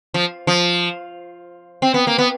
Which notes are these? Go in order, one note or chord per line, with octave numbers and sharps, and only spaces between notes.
F3
F3
C4
B3
A#3
B3